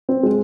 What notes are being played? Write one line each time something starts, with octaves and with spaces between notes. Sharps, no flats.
C4
G#3